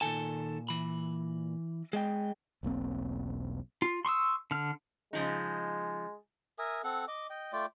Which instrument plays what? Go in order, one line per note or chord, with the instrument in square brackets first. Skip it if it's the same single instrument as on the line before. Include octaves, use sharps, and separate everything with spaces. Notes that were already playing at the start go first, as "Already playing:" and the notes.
[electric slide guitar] A#2 G#5 [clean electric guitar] D#3 A4 A5
[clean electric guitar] E3 B5
[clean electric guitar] G#3 [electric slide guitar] G#4 D#5 G5
[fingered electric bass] E1 B1 A#3 C4
[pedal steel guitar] F4
C6 C#6 D#6 E6
D3 F6
[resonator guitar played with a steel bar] C#3 F3 D#4 [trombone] G#3
[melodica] A#4 E5 G#5 D#6
C4 A4 F#5
D#5 D6
D#5 G5
A3 F4 D5 G5